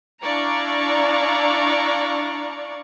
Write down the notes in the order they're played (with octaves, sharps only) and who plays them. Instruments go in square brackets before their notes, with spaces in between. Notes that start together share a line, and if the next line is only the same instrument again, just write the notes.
[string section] D4 E4 D5 F5 A#5 C#6